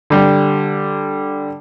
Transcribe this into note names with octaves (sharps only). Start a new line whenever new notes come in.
D3 G3